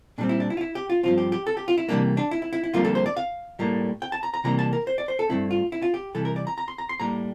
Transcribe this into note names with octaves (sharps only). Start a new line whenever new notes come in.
A#2 G3 C4 D4
E4
D4
E4
F4
E4
G4
F4
G2 F3 C4 F4
G4
G4
A4
G4
F4
E4
C3 E3 G3 A#3 D4
D4
E4
E4
E4
E4
F2 D3 G3 A#3 F4
A4
C5
D5
F5
A2 G3 A#3
G5
A5
A#5
A#5
C3 E3 G3 A#3 A#5
A5
A#4
C5
D5
C5
A4
G2 E3 A3 C4 E4
F4
E4
F4
G4
C3 E3 G3 A4
A#4
D5
A#5
A#5
C6
A#5
C6
A2 G3 A#3 A#5